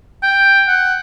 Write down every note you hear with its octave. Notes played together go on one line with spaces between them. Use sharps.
G5
F#5